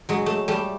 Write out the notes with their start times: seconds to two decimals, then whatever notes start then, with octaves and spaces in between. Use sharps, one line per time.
0.09 F#3 G#3
0.26 A3
0.48 G3 A3